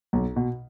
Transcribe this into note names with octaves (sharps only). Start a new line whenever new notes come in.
B1
B2